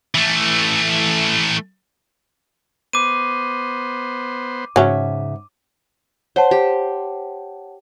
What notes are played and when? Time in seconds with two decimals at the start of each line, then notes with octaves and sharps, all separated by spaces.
0.15 E3 A3
2.93 B3 C5 D6 D#7
4.76 G#2 C#3 F#3 C#4 E5
6.36 C5 C#5 F#5 A5
6.51 G4